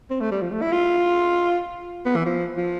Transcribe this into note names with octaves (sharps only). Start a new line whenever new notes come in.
C4
A3
G3
F3
A3
E4
F4
B3
E3
F3
F3